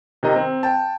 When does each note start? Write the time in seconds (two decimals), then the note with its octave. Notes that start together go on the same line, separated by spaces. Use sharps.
0.23 C3 D#3 D#5 A#5
0.36 C4
0.63 G5 A5